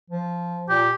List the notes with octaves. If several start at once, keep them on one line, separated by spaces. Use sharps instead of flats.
F3
A#2 G4